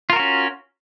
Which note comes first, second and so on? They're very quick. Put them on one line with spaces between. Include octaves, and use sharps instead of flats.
F4 A#4 F#4 C#4